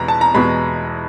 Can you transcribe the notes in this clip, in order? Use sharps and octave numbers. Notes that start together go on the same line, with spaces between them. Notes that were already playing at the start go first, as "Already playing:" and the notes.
Already playing: E2 B2 G#3 A#5 B5
A5
A#5
E2 B2 G#3 B5